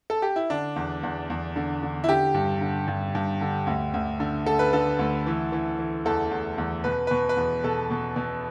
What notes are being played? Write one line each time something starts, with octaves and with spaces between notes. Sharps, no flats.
A4
G4
E4
D3 D4
E2
E2
E2
D3
D3
E4
D3 G4
G2
D3
G2
G2
D3
D2
D2
D3
D3 A4
B4
D3 A4
D2
E3
E3
E3
E2 A4
E2
E2
B2 B4
B2 B4
B4
E2
B2 A4
B2
B2